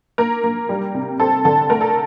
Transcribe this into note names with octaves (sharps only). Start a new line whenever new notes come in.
A#3 A#4
A#3
G3
C3
C4 A4
D3 A4
A3 A#4
A4